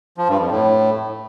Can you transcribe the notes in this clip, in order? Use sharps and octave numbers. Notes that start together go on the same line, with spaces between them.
F3
G2
F2
A2